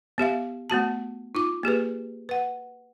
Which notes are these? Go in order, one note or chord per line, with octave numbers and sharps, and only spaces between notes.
B3 G4 E5 F5
A3 B3 F#4 A5
D#4 F4 D6
A#3 G4 G#4 B4
B4 F#5